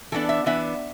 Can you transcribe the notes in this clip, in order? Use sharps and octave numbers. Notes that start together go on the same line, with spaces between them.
E3 B3 D4 A4
E5
E3 B3 D4 E5